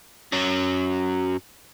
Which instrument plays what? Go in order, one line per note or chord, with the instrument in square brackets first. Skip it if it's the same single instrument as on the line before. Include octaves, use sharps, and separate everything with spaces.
[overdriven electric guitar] F#2 F#3